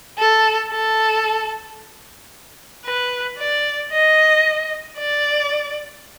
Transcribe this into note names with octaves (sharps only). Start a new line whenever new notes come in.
A4
A4
B4
D5
D#5
D5